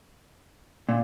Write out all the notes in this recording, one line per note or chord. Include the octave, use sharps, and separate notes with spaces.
A#2